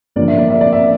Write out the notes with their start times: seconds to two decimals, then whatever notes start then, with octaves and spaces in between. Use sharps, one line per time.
0.16 A1 G2 D3 F3 A#3 D5
0.28 E5
0.38 D5
0.50 E5
0.61 D5
0.73 E5